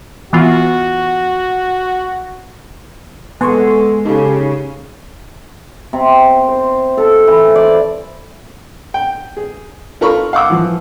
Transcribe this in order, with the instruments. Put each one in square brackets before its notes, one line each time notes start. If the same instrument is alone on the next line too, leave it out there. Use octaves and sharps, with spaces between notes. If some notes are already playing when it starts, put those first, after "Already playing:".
[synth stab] E3 B3 F4 [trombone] F#4
[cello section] G#3 [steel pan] B3 [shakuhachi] A4 [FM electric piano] G#5 C6 C#6
[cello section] C#3 [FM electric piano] D#4 A4 [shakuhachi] G4
[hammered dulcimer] C3
C5
A4
E3
D5
[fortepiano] G5
G#4
F4 A4 A#4 B5 C#6
F5 F#5 D6 E6
E3 F3